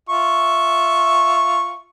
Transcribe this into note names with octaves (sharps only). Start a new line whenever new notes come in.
F4 E5 C#6